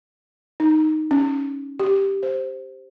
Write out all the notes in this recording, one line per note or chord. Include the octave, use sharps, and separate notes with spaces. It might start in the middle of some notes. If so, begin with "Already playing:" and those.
D#4
C#4
G4
C5